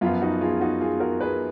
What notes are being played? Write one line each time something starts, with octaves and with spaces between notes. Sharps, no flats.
F#2 F3 B3 F4
D#4 F#4
F4 G#4
D#4 F#4
F4 G#4
F#4 A#4
G#4 B4